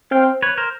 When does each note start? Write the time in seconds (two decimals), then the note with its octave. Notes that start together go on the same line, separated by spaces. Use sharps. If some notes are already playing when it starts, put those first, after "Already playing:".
0.11 C4 F5 G5
0.42 B4 C#5
0.58 A#4 C5